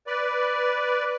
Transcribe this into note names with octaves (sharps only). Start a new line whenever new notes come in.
B4 D5